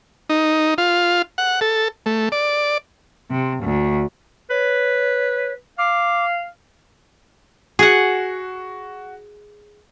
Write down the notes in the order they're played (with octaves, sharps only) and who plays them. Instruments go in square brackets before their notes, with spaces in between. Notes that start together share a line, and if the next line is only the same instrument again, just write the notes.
[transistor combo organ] D#4
F4
F#5
A4
A3
D5
[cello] C3
D2
[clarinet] B4 [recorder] C#5
[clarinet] F5 [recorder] D6
[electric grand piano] F#4 [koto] G#4 F#5